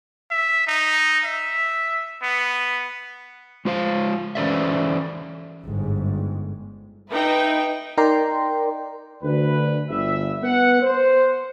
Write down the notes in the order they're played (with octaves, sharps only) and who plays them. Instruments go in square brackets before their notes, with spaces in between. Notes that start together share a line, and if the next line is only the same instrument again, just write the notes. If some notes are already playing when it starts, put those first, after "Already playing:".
[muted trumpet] E5
D#4
E5
B3
[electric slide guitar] G#3 F4 C5 F5
E3 C#4 A4 C5 D5 E5
[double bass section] G1 G#2
[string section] D#4 B4 E5 G5
[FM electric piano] D#4 A#4 D5 G5 A#5 C6
[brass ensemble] D2 B4
G1 E5
B3 B4 F#5
C5